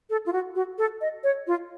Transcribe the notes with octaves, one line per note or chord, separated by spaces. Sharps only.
A4
F4
F#4
F#4
A4
D#5
C#5
F4